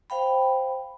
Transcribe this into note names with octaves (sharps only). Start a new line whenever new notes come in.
C5 F5 G5 B5